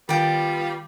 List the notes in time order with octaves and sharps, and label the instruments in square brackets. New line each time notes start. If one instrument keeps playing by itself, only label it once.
[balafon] D#3 [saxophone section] G3 B3 F4 [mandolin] D5 G5